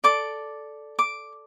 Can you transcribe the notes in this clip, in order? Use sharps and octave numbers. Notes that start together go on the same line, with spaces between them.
A4 D5 D6
D6